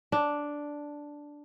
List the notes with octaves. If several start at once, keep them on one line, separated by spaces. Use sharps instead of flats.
D4